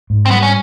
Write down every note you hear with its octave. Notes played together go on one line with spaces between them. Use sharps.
G#2
C4
G3 B3
C#4